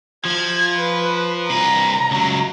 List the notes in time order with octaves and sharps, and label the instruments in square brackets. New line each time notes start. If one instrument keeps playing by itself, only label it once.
[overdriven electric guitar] F3 [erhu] G#6
[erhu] B4
[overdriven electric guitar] C2 B4 [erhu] A#5
[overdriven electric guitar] C#2 F#3